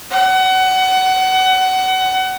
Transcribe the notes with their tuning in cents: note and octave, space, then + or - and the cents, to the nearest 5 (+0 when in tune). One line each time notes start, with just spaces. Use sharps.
F#5 +25